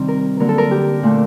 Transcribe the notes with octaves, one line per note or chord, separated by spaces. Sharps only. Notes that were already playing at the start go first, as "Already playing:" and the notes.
Already playing: C3 D#3 G3 C4
A#4
D3 F#3 A#3 A#4
A4
A#4
G4
A#2 A3 D4